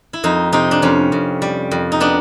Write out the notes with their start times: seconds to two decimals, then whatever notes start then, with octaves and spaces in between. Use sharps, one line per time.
0.13 E4
0.24 F2 D#4
0.53 C3 D#4
0.71 D4
0.82 F2 C#4
1.12 F2
1.42 G3
1.71 F2
1.92 D#4
2.00 B3 D4